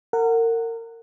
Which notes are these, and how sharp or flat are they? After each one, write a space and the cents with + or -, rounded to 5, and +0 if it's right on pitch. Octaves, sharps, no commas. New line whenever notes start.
A#4 -30 F#5 +0